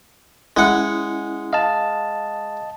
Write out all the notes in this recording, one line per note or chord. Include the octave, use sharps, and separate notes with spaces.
G#3 C#4 E4 F#5
D#5 F5 A5